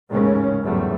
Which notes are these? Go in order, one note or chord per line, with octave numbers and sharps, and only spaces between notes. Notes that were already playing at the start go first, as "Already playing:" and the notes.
A1 D#2 G#2 C#3 G#3 C#4
F#1 E2 G#2 F#3 G3 A3